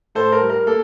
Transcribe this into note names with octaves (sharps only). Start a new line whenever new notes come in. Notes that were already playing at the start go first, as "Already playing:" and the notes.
A2 A4 C5
A#4
G3
A#4
A#3 A4